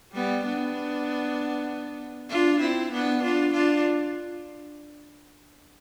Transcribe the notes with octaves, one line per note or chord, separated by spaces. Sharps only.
G3 B3
B3 D4
D4 F4
C4 E4
B3 D4
D4 F4
D4 F4